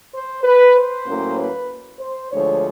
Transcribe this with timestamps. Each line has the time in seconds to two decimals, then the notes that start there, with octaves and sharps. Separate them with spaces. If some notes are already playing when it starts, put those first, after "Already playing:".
0.13 C5
0.44 B4
0.74 C5
1.06 A2 F#3 A#3 C#4
1.37 B4
2.00 C5
2.31 D2 D3 F3 G#3 C#5